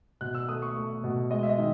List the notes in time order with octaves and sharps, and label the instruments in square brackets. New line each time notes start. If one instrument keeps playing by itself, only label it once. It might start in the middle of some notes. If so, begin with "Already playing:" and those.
[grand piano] B2 F#6
E6
A3 D#6
C#6
A3
B2
G#3 D#5
E5
D#5
D#3